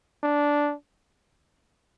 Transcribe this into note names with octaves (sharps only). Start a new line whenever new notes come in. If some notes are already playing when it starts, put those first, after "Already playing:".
D4